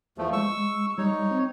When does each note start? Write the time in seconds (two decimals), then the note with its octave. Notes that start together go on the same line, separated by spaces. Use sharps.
0.18 E2 F3 A3
0.33 G#3 C#6 E6
0.98 G3 D#4 C#5
1.31 C4